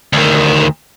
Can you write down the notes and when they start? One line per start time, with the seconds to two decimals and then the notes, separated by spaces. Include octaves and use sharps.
0.13 D2 D#3